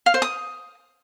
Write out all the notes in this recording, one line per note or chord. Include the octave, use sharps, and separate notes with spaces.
F5
C5
D#6